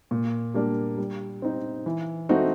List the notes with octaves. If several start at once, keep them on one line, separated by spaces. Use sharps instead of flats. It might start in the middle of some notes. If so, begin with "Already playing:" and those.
A#2
G3 A#3 D4
G3
C4 D#4
E3
A3 C4 D#4 F#4